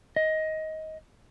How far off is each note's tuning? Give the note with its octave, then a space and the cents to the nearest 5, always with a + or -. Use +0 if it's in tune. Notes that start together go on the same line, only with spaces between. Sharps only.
D#5 +15